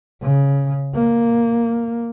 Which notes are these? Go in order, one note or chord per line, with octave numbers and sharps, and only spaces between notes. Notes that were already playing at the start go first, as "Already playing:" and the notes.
C#3
A#3